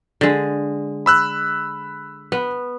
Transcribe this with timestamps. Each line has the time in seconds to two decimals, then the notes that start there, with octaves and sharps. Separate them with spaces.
0.21 D3 G#3
1.06 B5 E6 F#6
2.32 B3